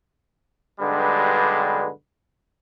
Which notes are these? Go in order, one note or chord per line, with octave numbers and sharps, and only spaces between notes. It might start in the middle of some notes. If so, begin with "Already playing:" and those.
B1 G2 D3 G3 G#3 B4